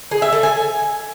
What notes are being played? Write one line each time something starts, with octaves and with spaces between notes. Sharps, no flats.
G#4
E5
A4
G#5